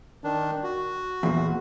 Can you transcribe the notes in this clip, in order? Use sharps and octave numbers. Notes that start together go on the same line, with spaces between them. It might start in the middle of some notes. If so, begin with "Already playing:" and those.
D#3 D4
F#4
E2 A#2